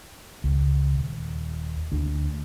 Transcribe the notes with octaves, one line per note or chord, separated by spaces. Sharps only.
C#2
D#1
D2